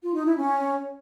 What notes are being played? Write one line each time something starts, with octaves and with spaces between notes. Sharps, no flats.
F4
D#4
E4
C#4